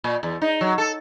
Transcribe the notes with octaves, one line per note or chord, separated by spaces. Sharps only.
A#2
E2
D#4
F#3
A4